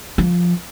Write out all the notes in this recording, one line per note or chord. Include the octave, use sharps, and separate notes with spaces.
F3